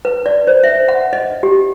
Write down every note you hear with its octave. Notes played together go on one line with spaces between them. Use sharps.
B4
D5
C5
E5
F#5
D#5
G4